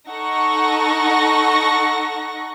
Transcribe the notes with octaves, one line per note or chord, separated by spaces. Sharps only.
D#4 A4 F#5 C#6 A#6